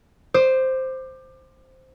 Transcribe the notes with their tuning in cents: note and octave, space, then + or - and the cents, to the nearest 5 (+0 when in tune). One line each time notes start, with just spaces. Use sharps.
C5 +0 D6 +25